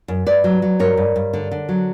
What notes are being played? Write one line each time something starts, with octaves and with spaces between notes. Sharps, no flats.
F#2
G2 B4 D5
F#3
F#3
G2 A#4 C#5
G2
G2
D3
D3
F#3